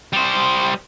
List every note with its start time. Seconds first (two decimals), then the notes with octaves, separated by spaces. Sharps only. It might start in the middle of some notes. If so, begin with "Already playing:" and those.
0.13 G3 C5